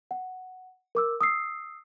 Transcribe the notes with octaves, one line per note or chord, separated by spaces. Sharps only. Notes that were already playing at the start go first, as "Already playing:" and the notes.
F#5
A#4 D6 E6
D#6 E6 C7